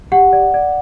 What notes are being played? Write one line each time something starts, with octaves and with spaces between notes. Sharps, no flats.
G4 F#5
D5
D5